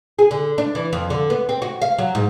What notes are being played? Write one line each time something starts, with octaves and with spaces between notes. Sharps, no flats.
G#4
D3
D4
E3
F2
D3
B3
C4
F#4
F5
F#3
G#2